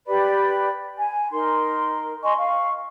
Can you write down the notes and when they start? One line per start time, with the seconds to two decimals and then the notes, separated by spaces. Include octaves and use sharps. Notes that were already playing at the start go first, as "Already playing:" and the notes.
0.07 G4 B4 D5 B5
0.96 G#5
1.31 D#4 A#4 C6
2.23 D#5 G#5 C6 C#6
2.36 F5 C#6